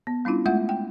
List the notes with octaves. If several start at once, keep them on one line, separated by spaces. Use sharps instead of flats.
B3
G3 C#4 D4 E4 F4
G#3 A3 F4 E5 F#5
G5